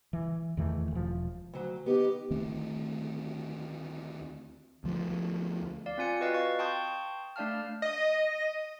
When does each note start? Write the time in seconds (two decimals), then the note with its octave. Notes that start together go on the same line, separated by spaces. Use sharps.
0.13 E3
0.57 E2 D#3 E3 A3
0.91 E1 F3
1.53 D2 F#3
1.86 B3 D#4 G4
2.30 D2 D#3 A3 C4
4.84 D2 F3
5.86 D5 F5
5.98 C4 F4 G#5 C#7
6.20 F#4 B4 D#5 F5 A6
6.34 C#6 A6 C7
6.59 G5 A5 C6 C#6 D#6 G6
7.36 A3 D4 D5 F5 A5 F6
7.82 D#5